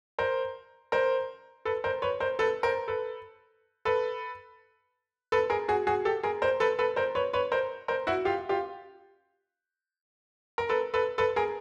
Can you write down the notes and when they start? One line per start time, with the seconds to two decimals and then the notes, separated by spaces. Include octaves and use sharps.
0.19 A#4 C5
0.92 A#4 C5
1.65 A4 B4
1.84 A#4 C5
2.02 B4 C#5
2.20 A#4 C5
2.39 A4 B4
2.63 A#4 C5
2.88 A4 B4
3.85 A4 B4
5.32 A4 B4
5.50 G#4 A#4
5.68 F#4 G#4
5.87 F#4 G#4
6.05 G4 A4
6.23 G#4 A#4
6.42 A#4 C5
6.60 A4 B4
6.79 A4 B4
6.96 A#4 C5
7.15 B4 C#5
7.33 B4 C#5
7.52 A#4 C5
7.88 A#4 C5
8.07 E4 F#4
8.25 F4 G4
8.49 F4 G4
10.58 A#4
10.69 A4 B4
10.94 A4 B4
11.18 A4 B4
11.36 G#4 A#4